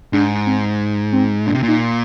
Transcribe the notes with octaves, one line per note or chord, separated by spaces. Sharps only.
G#2 D4
C4
C4
A#2 D4
C3
A#2
D#4